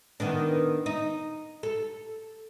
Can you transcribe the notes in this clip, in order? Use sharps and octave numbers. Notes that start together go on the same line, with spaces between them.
D#3 B3 D4
D#4
A4